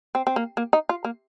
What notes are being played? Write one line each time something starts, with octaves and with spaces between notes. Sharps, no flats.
C4
C4
A#3
A#3
D#4
F4
A#3